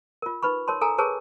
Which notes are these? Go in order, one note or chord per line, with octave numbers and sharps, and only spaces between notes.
F4 A#4
D#4 B4 B5 C#6
A#4 C#5 A5 C6
A4 A#4 G#5 A#5
G#4 A#4 B4 C#5 A5 C#6